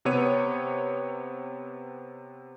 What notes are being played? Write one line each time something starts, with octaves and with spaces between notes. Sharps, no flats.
C3 B3 C#5 D#7